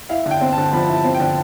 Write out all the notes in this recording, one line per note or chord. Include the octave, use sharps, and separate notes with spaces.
E4 F5
D3
G5
C4
A5
D3
F3 B5
E4
A5
C4
G5
D3